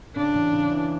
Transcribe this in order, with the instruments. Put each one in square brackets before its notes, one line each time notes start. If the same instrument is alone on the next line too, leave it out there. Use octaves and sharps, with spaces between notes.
[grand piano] C#3 [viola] D4
[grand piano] E2
C#3
E3